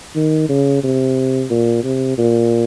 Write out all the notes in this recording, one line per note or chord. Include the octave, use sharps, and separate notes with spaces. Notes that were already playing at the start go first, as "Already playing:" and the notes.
D#3
C#3
C3
A#2
C3
A#2